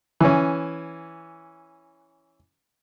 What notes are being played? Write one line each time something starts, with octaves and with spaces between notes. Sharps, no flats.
E3 C#4